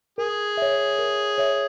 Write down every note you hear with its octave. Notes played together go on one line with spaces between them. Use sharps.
G#4 A#4
C#5 E5
A#4
C#5 E5